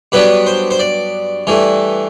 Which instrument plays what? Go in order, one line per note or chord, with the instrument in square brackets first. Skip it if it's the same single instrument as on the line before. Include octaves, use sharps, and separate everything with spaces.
[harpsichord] G2 F#3 B3 D4 B4
C5
C5
D5
G2 E3 A3